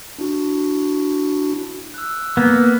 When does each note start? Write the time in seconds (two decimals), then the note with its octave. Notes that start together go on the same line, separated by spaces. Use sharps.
0.18 D4 E4 F#4
1.94 E6 F#6
2.37 A#3 B3